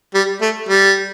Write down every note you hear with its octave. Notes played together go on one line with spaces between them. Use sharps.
G3
A3
G3